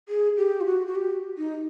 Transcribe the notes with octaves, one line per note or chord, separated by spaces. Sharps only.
G#4
G4
F4
F#4
F#4
G4
D#4